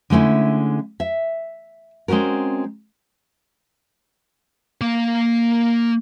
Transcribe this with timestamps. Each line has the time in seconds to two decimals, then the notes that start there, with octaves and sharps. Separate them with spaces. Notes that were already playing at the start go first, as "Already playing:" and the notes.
0.10 D3 G#3 A3 C#4 E4
1.00 E5
2.08 G#3 C4 C#4 F#4 A#4
4.81 A#3 F5